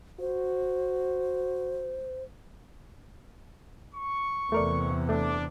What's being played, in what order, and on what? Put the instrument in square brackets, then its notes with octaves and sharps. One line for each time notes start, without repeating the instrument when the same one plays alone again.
[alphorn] F#4 [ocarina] C5
[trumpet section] C#6
[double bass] E2 C3 [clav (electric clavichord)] A3 A#4 D5
[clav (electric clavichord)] A3 [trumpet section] D4 D6